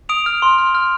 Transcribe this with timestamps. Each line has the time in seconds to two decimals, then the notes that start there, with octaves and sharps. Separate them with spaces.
0.09 D#6 D7 F7
0.26 F6
0.42 C6
0.58 F6
0.75 F6